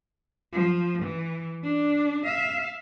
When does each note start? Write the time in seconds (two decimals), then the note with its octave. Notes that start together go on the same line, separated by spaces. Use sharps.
0.52 F3
1.02 E3
1.64 D4
2.25 E5 F5